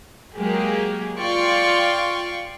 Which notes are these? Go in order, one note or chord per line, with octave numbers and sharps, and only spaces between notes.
F#3 G#3 A#3 G4 G#4
F4 D5 F5 G5 C6 C#6